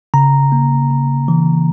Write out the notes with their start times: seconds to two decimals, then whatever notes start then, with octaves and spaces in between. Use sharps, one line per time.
0.14 C#3 A#5
0.52 A#3
0.90 C#3
1.28 E3